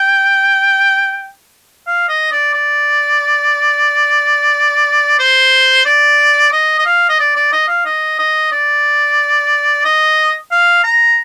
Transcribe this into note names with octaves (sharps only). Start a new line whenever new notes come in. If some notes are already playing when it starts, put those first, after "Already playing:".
Already playing: G5
F5
D#5
D5
D5
C5
D5
D#5
D#5
F5
D#5
D5
D5
D#5
F5
D#5
D#5
D5
D#5
F5
A#5